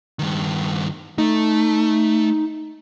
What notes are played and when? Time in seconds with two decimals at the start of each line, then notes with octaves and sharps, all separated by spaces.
0.19 G2 D#3
1.18 A3 D#4